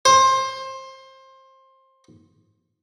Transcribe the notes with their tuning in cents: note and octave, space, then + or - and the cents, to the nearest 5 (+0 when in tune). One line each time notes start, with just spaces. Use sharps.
C5 +20